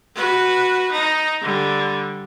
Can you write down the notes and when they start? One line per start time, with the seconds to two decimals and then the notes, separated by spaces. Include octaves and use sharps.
0.15 F#4 B4
0.92 D#4
1.42 D3 G3